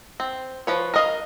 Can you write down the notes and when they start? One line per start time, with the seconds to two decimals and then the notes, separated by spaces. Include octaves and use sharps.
0.20 C4
0.67 F3 B4 C#5
0.94 A#4 D#5 F5